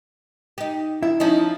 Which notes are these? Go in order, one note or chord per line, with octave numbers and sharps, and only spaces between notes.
D#4 G4
E4
F3 C#4 D#4